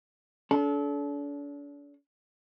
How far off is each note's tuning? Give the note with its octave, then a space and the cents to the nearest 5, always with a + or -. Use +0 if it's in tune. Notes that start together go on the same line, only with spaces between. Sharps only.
D4 -40 A4 -30